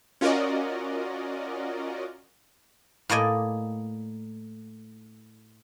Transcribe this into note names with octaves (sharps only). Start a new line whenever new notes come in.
C#4 F4 F#4 A#4 D5 D#5
A2 A#3 D5 D#5 G#5